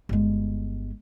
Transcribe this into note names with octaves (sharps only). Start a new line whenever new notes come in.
G1 G#3